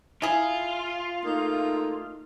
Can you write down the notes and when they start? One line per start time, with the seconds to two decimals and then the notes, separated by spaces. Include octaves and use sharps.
0.22 E4 F4 G#4
1.24 A3 A#3 D#4